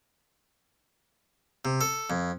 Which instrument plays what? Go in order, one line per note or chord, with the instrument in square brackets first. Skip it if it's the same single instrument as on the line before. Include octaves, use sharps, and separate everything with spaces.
[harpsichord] C3
A4
F2